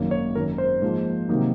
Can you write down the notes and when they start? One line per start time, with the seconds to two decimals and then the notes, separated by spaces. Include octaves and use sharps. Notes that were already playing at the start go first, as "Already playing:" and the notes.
Already playing: G#1 F#2 D#3 F#3 A#3
0.11 C#5
0.35 G#1 F#2 D#3 A#4
0.58 C5
0.82 G#2 F3 A#3
1.29 C3 D#3 F#3 A#3 D#4